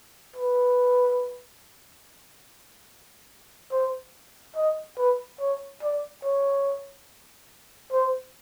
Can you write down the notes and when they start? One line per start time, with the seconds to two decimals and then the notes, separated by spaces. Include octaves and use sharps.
0.37 B4
3.72 C5
4.57 D#5
4.98 B4
5.41 C#5
5.83 D5
6.24 C#5
7.93 C5